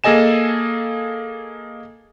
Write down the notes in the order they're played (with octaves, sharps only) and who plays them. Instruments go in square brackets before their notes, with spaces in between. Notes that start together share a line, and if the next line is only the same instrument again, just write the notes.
[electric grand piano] A#3 G#4 A4 D#5 G#5 E7